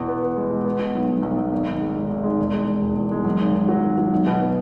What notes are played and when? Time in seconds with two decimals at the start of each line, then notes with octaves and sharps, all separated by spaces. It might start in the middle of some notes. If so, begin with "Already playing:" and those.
Already playing: E2 B2
0.08 B3
0.23 B3
0.37 G#3
0.50 B2
0.65 B3
0.79 B2
0.95 B1
1.08 B1
1.22 B1
1.37 B1
1.52 G#1
1.67 G#1
1.80 G#3
1.96 G#1
2.09 G#1
2.24 G#3
2.38 E1
2.52 G#3
2.67 G#3
2.81 E1
2.97 E2
3.11 G#3
3.25 F#2
3.40 G#1
3.54 G#1
3.68 F#3
3.83 G#1
3.98 F#3
4.11 B1
4.27 B2
4.40 B3